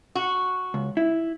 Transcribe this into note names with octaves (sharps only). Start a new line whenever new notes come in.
F#4
C#2
E4